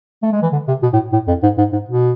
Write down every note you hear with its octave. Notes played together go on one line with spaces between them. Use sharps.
A3
G#3
E3
D3
C3
B2
A2
A2
F2
G#2
G#2
G#2
B2